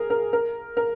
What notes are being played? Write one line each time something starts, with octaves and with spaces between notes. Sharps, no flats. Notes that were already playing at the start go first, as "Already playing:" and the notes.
Already playing: G#4 A#4
A#4
A#4
A#4